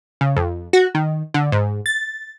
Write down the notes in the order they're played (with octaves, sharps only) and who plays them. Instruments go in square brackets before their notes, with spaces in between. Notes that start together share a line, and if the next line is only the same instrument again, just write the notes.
[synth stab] C#3
F2
F#4
D#3
D3
G#2
A6